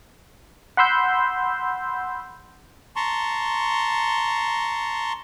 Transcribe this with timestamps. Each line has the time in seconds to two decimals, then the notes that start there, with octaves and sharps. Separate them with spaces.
0.77 F#5 B5 C6 E6 G6
2.96 A5 A#5 C6 C#6